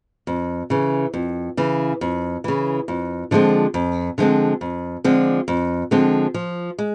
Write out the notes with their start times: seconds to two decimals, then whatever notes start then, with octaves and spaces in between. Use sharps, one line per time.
0.27 F2
0.70 C#3 E3
1.14 F2
1.57 C#3 E3
2.01 F2
2.44 C#3 E3
2.88 F2
3.31 D3 F3 G#3 C4
3.74 F2
4.18 D3 F3 G#3 C4
4.61 F2
5.04 D3 F3 G#3 C4
5.48 F2
5.91 D3 F3 G#3 C4
6.34 F3
6.79 G#3